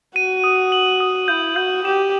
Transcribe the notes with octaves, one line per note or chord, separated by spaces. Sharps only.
F#4 D#7
D#6
F#7
D#6
E4 G6
F#4 G6
G4 E7